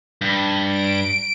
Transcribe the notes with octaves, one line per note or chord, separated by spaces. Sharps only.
G2
D7